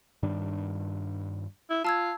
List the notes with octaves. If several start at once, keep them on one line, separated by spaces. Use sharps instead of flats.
G2 D#3 D4
E4
F4 A5 E6 G#6